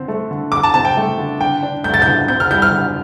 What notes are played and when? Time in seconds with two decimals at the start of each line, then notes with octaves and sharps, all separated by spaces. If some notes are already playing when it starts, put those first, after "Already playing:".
Already playing: D3 C4
0.08 A3
0.31 D3
0.52 D3 D6
0.63 A5
0.74 C4 A5
0.85 G5
0.97 A3
1.18 D3
1.41 D3 G5
1.63 D4
1.84 A3 G6
1.94 A6
2.02 D3 G6
2.28 C4 G6
2.40 F6
2.51 G3 G6
2.62 F6
2.72 D3